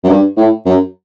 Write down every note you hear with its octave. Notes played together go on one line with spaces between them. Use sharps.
F#2
G2
A2
F#2